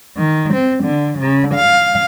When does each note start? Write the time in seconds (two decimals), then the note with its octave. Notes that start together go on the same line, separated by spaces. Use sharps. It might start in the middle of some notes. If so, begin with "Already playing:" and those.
0.18 D#3
0.53 C4
0.83 D3
1.18 C#3
1.55 F5